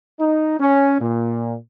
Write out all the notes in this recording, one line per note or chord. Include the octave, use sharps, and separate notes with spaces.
D#4
C#4
A#2